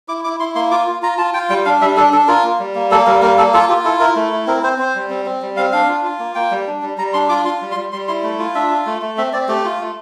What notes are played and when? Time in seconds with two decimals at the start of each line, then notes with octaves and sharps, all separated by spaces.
0.08 E4 D6
0.24 E4 D6
0.40 E4 C6
0.55 A#3 C6
0.71 F4 D6
0.88 F4
1.02 F4 A#5
1.18 F4 A5
1.34 F4 G5
1.50 G3 G5
1.66 D4 F5
1.81 G3 E5
1.97 D4 A4
2.13 D4 A4
2.28 F4 A#4
2.44 A#3
2.59 G3
2.75 A#3
2.91 A#3 A4
3.06 G3 A#4
3.22 A#3 A#4
3.38 A#3 A4
3.54 F4 A4
3.69 F4 G4
3.84 E4 A4
4.00 E4 A#4
4.16 A3
4.32 E4
4.47 C4 A#4
4.63 C4 C5
4.78 C4 C5
4.95 G3
5.10 C4
5.26 C4
5.42 G3
5.57 C4 F5
5.72 D4 F5
5.89 F4
6.04 F4
6.19 A#3
6.35 A#3 G5
6.51 G3
6.67 D4
6.82 G3
6.98 G3 A#5
7.13 D4 C6
7.29 F4 D6
7.45 F4 C6
7.61 G3
7.71 C6
7.77 G3
7.92 G3 C6
8.08 E4 C6
8.24 A3
8.39 F4
8.55 D4 E5
8.71 F4
8.86 A3
9.02 A3
9.18 C4 E5
9.33 C4 D5
9.48 A3 G4
9.65 F4
9.80 A3